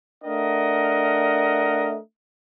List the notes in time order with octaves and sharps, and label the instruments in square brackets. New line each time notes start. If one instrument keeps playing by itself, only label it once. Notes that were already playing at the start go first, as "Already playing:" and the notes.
[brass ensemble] A3 D4 A#4 D#5 F#5